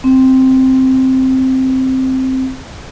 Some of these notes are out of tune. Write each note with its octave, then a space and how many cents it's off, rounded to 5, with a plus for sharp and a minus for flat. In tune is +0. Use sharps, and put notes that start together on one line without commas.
C4 +0